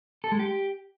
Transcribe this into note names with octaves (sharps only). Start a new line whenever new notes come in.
A4
G#3
G4